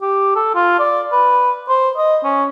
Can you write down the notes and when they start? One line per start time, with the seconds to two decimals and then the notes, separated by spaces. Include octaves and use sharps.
0.02 G4
0.36 A4
0.55 F4
0.80 D5
1.12 B4
1.69 C5
1.97 D#5
2.24 C#4